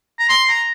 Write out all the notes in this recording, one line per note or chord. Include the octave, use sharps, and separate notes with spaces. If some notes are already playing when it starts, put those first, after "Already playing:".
A#5
C6
A#5